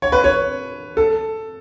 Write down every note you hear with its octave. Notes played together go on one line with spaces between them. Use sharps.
C#5
B4
C#5
A4